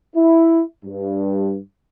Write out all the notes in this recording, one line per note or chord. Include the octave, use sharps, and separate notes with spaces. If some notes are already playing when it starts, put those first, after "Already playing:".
E4
G2